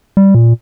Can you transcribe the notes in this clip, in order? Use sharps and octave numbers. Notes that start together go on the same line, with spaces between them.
G3
A#2